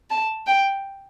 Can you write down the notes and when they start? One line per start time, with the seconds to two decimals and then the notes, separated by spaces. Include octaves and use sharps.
0.10 A5
0.46 G5